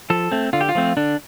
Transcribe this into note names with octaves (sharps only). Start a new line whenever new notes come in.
F3 A4
A3 C4
D3 F4
G4
F4
F3 A3 C4
D3 D4